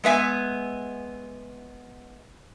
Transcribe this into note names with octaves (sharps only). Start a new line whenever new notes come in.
G#3 B3 E5 G#5